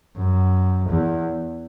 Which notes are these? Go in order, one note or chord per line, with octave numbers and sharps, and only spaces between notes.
F#2
E2